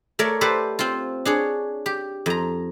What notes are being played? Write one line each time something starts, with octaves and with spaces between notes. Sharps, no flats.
A3 A#4 C#5 D5
G4 A4 B4 C5 D5
C4 F4
D4 G#4 C#5
G4
F2 A#5